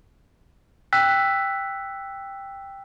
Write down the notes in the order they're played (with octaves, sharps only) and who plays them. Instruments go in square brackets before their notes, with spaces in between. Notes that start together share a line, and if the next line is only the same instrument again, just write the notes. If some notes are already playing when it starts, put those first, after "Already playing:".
[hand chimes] G5 E6 F#6 B6